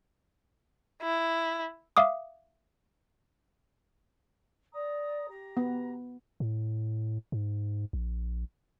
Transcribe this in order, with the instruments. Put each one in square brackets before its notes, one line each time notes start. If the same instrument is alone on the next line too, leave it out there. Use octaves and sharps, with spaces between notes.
[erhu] E4
[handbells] E5 F5 D6 D#6
[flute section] D5 A#5 D#6
G4 A#5
[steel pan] B3
[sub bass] A2
G#2
A#1